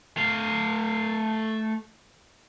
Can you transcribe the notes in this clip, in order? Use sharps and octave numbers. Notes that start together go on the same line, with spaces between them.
A3 F5